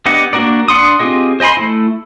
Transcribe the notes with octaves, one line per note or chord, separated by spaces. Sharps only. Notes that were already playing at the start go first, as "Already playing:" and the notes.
B3 D4 G4 D#5 F#5
A#3 D4 F#4 A#4 D5
D4 D5 F#5 C6 D#6
C4 F4 G4 G#4 D#5
C5 D#5 G#5 B5 C6
A3 E4